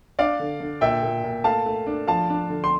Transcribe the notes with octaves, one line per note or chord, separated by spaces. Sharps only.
D4 D5 F5
D3
D3
A#2 E5 G5
A#2
A#2
A3 F5 A5
A3
D4
F3 F5 A5
D4
D3
C6